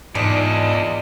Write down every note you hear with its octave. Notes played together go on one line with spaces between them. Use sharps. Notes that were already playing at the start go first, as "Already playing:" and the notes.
E2 G#2 D4 F4 D#5